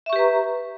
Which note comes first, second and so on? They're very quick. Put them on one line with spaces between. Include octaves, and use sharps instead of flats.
E5 C#6 G4 B4 A#5